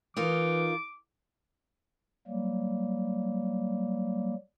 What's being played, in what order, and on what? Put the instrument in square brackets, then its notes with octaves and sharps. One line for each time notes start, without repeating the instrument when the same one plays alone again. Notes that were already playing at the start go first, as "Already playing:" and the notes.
[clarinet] E3 [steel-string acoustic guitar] D#4 F4 A#4 [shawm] D6
[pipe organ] F#3 G3 A#3